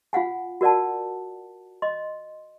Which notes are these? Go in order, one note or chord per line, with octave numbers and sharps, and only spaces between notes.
F4 F5 F#5 G#5
F#4 A#4 D5 F#5 A5
D#5 C6